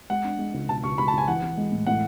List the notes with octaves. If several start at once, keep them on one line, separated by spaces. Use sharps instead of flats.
G#3 F#5
D4
G#3
C#2
B2 A5
C#2 C#6
C#2 B5
A5
C#2 G#5
E3 F#5
E3
G#3
A2
A2 F#5